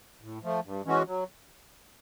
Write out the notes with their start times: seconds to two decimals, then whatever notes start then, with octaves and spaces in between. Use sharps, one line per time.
0.21 A2
0.43 F3 A3
0.65 G2
0.86 E3 G#3 C#4 F#4
1.07 F#3